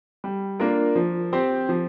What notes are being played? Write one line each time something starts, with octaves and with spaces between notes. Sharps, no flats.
G3
A#3 D4 F4 A#4
F3
C4 G4 C5
F3